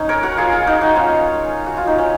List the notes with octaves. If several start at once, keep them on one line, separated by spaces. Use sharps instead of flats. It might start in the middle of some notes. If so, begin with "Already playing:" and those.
Already playing: C#4 D#4
A#4 C#5
F#4 A#4
F4 G#4
F4 G#4
D#4 F#4
D#4 F#4
C#4 F4
F#4
F4
D#4
C#4